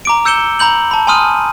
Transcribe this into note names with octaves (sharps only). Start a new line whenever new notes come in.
A#5 D6 D7
E6 G6 C#7 E7 G7
A#5 B5 G6 F#7
A5 B5
G#5 B5 C6 D#6 F6 D#7